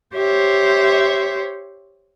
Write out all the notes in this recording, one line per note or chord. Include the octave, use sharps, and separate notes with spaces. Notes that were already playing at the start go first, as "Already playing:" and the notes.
G4 C5 C#5 E5